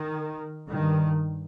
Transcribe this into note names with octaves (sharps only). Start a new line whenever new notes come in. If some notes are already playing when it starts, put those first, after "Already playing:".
Already playing: D#3
G2 D#3